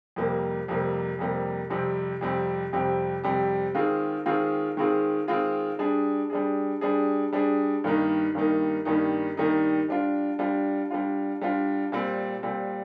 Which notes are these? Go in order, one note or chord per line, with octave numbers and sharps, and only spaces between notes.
F2 C3 G3 A#3
F2 C3 G3 A#3
F2 C3 G3 A#3
F2 C3 G3 C4 G4
F2 C3 G3 C4 G4
F2 C3 G3 C4 G4
F2 C3 G3 C4 G4
D#3 G#3 C4 F4 G#4
D#3 G#3 C4 F4 G#4
D#3 G#3 C4 F4 G#4
D#3 G#3 C4 F4 G#4
G3 D4 G#4
G3 D4 G#4
G3 D4 G#4
G3 D4 G#4
G2 D#3 G3 A#3 D#4
G2 D#3 G3 A#3 D#4
G2 D#3 G3 A#3 D#4
G2 D#3 G3 A#3 D#4
G3 D4 F4
G3 D4 F4
G3 D4 F4
G3 D4 F4
A#2 G3 C4
A#2 G3 C4